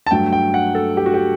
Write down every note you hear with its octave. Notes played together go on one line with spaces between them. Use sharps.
A5
G2 F#3 A3 G5
G5
F#5
A4
G4
F#4
G4